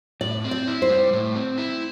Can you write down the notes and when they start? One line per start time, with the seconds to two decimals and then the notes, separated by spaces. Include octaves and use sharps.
0.21 A2 D5
0.44 C4
0.51 D5
0.67 E4
0.82 C5
0.89 G3
1.13 A2
1.35 C4
1.58 E4